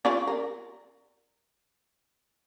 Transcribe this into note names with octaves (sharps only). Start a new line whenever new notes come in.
C#4 F4 D5
A#4